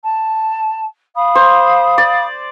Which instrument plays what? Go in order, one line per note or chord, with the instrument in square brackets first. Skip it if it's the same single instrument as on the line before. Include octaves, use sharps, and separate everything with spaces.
[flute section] A5
F5 B5 D#6
[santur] C5
D5